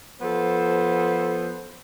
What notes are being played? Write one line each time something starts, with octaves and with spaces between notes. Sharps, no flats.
F3 B3 A4 C5